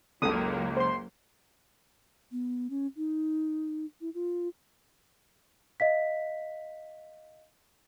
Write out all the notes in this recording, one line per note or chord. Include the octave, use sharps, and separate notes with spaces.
F#1 C#2 F#3 A#3 A4 D#6
C5 C6
B3
C#4
D#4
E4
F4
D#5 F5 B6